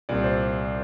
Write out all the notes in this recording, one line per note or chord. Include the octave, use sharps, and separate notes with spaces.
C2 A#2 D5
C5